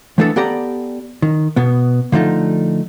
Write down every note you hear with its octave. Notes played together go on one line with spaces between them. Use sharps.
E3 A3 B3 D4 G#4 A4
B3 G4 A4 D5 A#5
D#3
B2 B3
D3 F3 A3 D#4